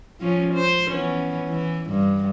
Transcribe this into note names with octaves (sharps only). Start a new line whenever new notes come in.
F3 C#4
C5
E3 B3 C#4
E3
G2